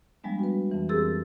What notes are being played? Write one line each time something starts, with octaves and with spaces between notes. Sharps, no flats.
F3 G3 G#3 B3 D4
F#4 B4
F2 E3
C4 G4 G#4 A#4 E6 A6